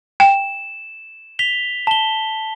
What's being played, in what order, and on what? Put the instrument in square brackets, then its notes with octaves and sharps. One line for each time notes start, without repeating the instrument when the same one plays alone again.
[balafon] G5 [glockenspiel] E7
[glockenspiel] B6 F7 G7
A5 G7